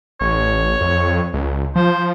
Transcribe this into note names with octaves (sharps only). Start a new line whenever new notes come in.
A1 C#5
F2
C#2
F3 C5